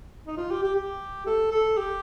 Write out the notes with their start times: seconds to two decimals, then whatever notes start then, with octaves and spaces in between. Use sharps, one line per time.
0.27 D#4
0.37 F4
0.50 G4
0.63 G4
0.75 G4
1.26 A4
1.52 A4
1.77 G4